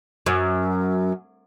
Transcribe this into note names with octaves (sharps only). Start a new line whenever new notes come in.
F#2